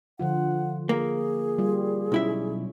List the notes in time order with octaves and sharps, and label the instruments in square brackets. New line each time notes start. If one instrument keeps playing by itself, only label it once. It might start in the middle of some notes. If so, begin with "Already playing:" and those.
[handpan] D3 F3 F4 [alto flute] F#5
[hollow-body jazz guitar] A#3 [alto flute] G#4
[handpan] G3 F4
[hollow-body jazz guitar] B1 E4 E5 [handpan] C#4